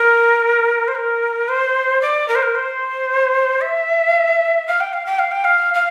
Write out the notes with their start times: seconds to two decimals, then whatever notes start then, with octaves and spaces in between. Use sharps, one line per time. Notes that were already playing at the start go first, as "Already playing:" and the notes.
Already playing: A#4
0.88 C5
0.95 A#4
1.48 C5
2.01 D5
2.28 A#4
2.35 C5
2.43 A#4
2.55 C5
3.61 E5
4.67 F5
4.80 G5
4.93 F5
5.06 G5
5.19 F5
5.31 G5
5.44 F5
5.74 F5